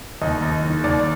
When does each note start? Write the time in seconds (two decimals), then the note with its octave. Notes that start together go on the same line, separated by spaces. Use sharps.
0.22 D#2 D#5
0.42 D#2
0.63 D#3
0.84 D#2 D5